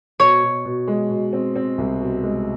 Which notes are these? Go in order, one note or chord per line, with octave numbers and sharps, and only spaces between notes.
B2 C#5
B2
B2
G#3
B2
C4
C4
C2
B2
G#3